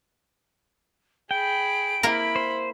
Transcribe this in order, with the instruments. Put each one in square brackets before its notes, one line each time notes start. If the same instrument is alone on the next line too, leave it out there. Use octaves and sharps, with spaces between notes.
[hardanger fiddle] G#4 B5 [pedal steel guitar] G5 [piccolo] D7
[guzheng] A#3 A#4 [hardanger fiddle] E4 B5
[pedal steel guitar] C5